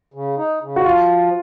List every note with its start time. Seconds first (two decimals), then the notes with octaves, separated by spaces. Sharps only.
0.14 C#3
0.37 D#4
0.62 C#3
0.76 F#4
0.84 F3 F4